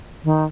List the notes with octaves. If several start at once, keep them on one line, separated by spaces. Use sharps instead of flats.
D#3